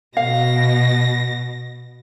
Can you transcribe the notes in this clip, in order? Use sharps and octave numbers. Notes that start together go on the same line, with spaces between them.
B2 F5 A#6